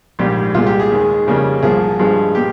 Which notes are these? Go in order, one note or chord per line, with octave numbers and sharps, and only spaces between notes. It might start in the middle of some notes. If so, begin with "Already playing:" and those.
A#1 G#2 D#3 G3 G4
C2 A#2 G#3 F4
G4
G#4
D#2 D#3 G#3
F2 C#3 G3 A#3
C2 A#2 F3 A#3 G#4
G2 F3 G#3
A#2 G4